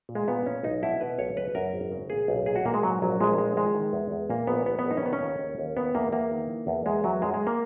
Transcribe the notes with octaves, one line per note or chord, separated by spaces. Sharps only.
A#2
G#3
A#2 B3
A#2 C#4
B1 D#4
B2 E4
B2 B4
B1 C#5
C#3 B4
F#2 A#4
G#1
C#3
A#2 G#4
B1
A#2 G#4
F#4
A#2 A#3
G#3
G#2 F#3
A#1 F#3
A#1 G#3
E3 G#3
D#3 G#3
D#3
E2
E2
A#2 A#3
A#1 B3
A#1 B3
B3
A#1
D#4
C#4
D#3 B3
C#4
D#2
D#2
D#2
D#3 B3
E2 A#3
E2 A#3
D#3
E3
E2
E2 G#3
E2 F#3
F#2 G#3
G#3
A#3